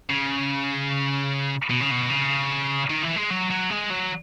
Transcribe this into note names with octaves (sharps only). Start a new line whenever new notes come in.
C#3
B2
C#3
B2
C#3
D#3
E3
G#3
F#3
F#3
G#3
F#3